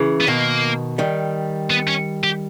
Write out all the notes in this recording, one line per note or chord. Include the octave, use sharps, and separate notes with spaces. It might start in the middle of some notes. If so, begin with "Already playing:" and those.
Already playing: C#3 E3
B3
B2 D#3 A#3
D#3 G3
B3
C#4
G4